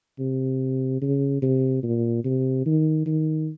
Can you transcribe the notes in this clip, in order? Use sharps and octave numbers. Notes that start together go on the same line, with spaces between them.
C3
C#3
C3
A#2
C3
D#3
D#3